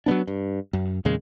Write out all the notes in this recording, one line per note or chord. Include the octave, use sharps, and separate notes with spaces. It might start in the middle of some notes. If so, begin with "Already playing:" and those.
F#3 G3 B3 D4
G2
F#2
E2 A#2 C#3 G#3